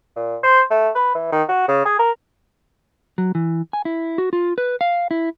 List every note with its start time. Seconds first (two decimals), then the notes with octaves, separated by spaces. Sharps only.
0.16 A#2
0.43 C5
0.71 A3
0.95 B4
1.15 E3
1.33 D#3
1.49 F#4
1.68 C#3
1.85 G#4
1.99 A#4
3.18 F#3
3.35 E3
3.73 G#5
3.85 E4
4.18 F#4
4.33 F4
4.58 B4
4.81 F5
5.11 E4